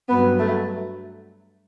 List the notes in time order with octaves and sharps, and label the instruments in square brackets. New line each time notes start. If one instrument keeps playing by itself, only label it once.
[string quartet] G2 F#3 B3
A3